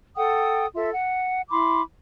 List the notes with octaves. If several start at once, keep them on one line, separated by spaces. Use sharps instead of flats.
A4 F#5 G5 D#6
F4 A4 E5
F#5
E4 B5 C6 D6